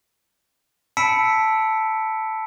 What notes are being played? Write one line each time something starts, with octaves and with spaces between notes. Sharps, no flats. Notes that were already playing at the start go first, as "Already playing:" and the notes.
A5 B5 E6 B6 C#7 D7